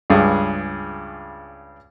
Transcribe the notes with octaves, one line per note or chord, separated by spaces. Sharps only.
C#2 G2 G#4